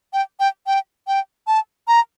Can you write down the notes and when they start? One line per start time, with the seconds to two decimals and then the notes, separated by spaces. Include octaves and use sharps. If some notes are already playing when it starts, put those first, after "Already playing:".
0.13 G5
0.40 G5
0.67 G5
1.07 G5
1.47 A5
1.88 A#5